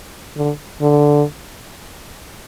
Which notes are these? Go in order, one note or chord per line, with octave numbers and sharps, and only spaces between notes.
D3
D3